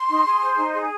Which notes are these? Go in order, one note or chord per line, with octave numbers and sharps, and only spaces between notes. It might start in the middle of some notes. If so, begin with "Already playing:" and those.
Already playing: C6
D#4
G#4
C5
D#4
G#4